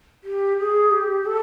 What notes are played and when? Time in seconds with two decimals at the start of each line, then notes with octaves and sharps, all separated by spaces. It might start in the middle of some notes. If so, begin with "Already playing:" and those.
0.23 G4
0.58 G#4
0.91 G4
1.25 A4